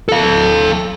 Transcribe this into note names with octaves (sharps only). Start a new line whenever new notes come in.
A4 F5